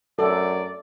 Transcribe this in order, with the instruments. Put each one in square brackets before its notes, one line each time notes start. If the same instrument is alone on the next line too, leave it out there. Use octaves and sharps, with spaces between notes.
[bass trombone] F#2 [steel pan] A4 [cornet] D5